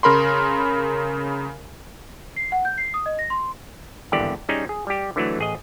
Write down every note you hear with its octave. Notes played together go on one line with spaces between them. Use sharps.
C#3 A#4 B5 C6
C7
F#5
G6
C7
D#6
D#5
A#6
C6
G#1 E2 G2 D3 G4 D5
G3 C#4 D#4 G#4
G#4
G3 G4
D3 E3 F#3 A3
A1 G#4 D#5